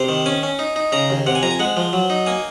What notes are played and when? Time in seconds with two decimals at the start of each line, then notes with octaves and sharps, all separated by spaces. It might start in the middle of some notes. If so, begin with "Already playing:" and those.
Already playing: C3 C5
0.09 D#3
0.26 C#4 G#5
0.43 C#4
0.59 D#4
0.76 D#4
0.92 C#3 A#5
1.10 D#2
1.27 C3 F#5
1.35 G#5
1.43 F2 A#5
1.51 G#5
1.59 G#3 F#5
1.77 F3
1.93 F#3
2.10 D#4
2.26 A#3 G#5